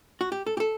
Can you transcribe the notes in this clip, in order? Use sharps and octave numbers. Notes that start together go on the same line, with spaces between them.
F#4
G4
A4
G4
A4